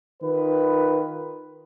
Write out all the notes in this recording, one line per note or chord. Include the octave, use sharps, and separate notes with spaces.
D#3 F4 B4